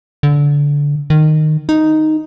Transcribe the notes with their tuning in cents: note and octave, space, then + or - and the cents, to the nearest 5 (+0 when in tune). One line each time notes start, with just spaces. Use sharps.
D3 -20
D#3 -15
D#4 +0